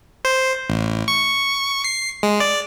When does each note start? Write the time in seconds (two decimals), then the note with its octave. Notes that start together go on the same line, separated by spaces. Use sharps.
0.25 C5
0.70 A1
1.08 C#6
1.84 C7
2.23 G#3
2.40 D5